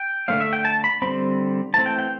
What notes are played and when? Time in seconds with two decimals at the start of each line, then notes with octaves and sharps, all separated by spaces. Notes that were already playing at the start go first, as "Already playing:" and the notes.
Already playing: G5
0.28 D3 A3 C4 F5
0.40 E5
0.53 G5
0.65 A5
0.84 B5
1.02 D3 G3 C4 B5
1.74 E3 A3 C4 A5
1.86 G5
1.99 G5